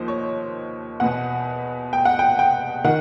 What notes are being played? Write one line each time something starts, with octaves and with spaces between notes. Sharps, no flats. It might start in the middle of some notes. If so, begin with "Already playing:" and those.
Already playing: D#2 F3 C5
C#5
E2 B2 F#5
G5
F#5
G5
G5
D#3 F#5